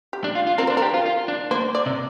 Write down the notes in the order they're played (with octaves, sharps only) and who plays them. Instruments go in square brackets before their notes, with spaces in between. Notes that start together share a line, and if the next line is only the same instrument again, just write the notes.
[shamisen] G4
[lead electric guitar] D4
F4
F4
[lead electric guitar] C4 [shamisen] A#4
[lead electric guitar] D4 [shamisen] C5
[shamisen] A#4
[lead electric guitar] G4
F4
F4
D4
[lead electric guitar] A#3 [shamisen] C5
[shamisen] D5
[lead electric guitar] C3